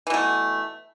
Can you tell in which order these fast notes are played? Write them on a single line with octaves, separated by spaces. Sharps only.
E3 B2 A3